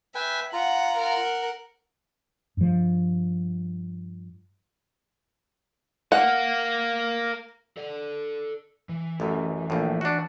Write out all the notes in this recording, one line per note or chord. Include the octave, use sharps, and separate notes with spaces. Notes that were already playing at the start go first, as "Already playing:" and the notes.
B4 E5 G5 G#5
F4 F#5 A#5
A#4 F#5
G2 F3
A#4 F5 F#5
A4 D5
E3
A1 F#2
A#1 A2
D4 F#4